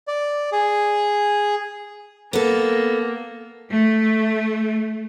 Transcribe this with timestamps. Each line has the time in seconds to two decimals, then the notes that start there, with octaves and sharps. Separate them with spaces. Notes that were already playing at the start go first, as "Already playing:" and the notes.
0.08 D5
0.52 G#4
2.33 A#3 B3 A4
3.70 A3